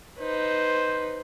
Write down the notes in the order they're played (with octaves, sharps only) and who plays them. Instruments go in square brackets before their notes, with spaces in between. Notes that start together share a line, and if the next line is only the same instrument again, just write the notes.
[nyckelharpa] D#4 B4 [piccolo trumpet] C5